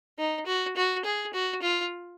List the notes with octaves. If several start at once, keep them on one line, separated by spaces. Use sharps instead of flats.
D#4
F#4
F#4
G#4
F#4
F4